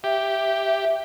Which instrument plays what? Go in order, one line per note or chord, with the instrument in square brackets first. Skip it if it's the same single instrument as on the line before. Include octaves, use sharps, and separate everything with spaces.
[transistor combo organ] G4 [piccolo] E5